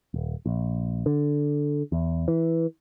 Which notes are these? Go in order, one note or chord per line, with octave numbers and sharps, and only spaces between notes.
D#1
A#1
D3
E2
E3